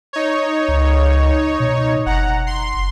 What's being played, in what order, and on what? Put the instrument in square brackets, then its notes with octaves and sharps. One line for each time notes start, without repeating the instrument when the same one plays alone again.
[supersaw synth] D#4 C#5
[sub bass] C#2
B2
[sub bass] F#1 [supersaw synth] F#5 A#5
[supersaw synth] C6